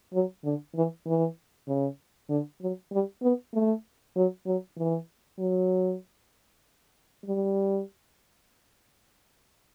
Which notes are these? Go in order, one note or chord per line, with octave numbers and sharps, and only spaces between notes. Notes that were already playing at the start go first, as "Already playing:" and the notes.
F#3
D3
E3
E3
C#3
D3
F#3
G3
B3
A3
F#3
F#3
E3
F#3
G3